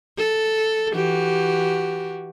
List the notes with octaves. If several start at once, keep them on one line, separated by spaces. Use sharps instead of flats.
A4
E3 F#4 G4